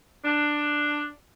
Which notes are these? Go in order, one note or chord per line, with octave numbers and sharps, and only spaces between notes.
D4